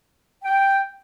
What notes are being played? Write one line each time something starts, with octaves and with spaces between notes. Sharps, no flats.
G5